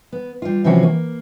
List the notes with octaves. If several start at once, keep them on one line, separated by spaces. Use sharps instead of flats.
B3
G3 F4
C3 E3 F3 C#4 F#4
A#3